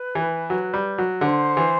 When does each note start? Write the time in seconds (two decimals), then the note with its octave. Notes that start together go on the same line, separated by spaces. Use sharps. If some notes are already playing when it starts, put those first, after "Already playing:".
Already playing: B4
0.15 E3
0.50 F#3
0.74 G3
0.98 F#3
1.21 D3 C5
1.57 E3